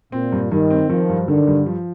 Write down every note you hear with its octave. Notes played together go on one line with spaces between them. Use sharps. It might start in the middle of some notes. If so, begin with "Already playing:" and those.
A#2 C4
G2
G2 D#3
C4
D#3 F3
G2
D3 D#3
G2
F3